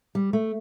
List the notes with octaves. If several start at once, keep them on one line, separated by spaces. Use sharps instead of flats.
G3
A3